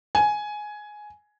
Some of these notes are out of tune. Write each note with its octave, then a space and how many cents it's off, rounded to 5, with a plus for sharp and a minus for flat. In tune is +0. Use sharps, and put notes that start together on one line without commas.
G#5 +10